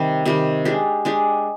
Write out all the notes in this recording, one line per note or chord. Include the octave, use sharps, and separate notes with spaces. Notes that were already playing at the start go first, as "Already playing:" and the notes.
Already playing: C3 D#3 G3
C3 D#3 G3
G#3 D4 G4
G#3 D4 G4